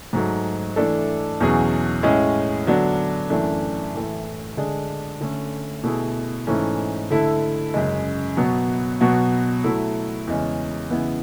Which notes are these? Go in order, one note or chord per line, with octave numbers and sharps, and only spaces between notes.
G#2 F#3 A3
E3 A3 D4 A4
E2 B2 F#3 C#4 G#4
A2 G#3 C#4 G#4
D3 F#3 B3 D4
F#2 E3 A3 D4
A2 E3 A3
D3 G#3 D4 G#4
D3 A3 C#4
B2 A3 E4 G#4
G#2 E3 A3 C#4
D3 A3 E4 A4
F#2 C#3 G#3
B2 F#3 B3
B2 F#3 B3 F#4
F#3 A3 E4
E2 C#3 G#3 C#4
C#3 E3 G#3 B3 E4